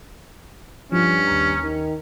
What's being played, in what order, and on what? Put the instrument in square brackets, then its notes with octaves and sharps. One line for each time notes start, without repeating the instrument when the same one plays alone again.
[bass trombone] G2 [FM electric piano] F3 F4 [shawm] C#4
[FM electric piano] D#2 A#5
[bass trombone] D#3